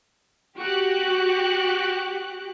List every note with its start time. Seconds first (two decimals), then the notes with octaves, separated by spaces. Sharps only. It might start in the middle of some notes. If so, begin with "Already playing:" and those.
0.57 F#4 G4 F#6